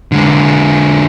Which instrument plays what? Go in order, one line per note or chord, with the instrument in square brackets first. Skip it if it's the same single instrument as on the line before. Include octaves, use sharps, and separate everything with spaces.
[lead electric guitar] D3 G#3